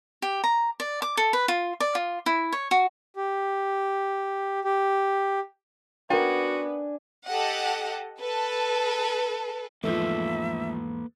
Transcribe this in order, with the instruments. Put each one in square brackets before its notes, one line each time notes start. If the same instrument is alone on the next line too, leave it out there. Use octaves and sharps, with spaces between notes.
[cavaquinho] G4
A#5
D5
D6
A4
B4
F4
D5
F4
E4
C#5
F#4
[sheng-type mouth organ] G4
G4
[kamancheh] B3 [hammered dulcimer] D4 G#5 [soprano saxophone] F#4 [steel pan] A#4 G5
[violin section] G4 A4 D#5 F#5
A4 B4
[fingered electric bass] E2 G#2 [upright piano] F3 A3 [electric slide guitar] A#3 A4 B4 [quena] E5